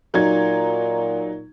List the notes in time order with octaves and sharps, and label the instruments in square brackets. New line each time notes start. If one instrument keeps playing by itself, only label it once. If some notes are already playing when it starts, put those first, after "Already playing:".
[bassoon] A#2 [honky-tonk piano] F#3 D#4 G#6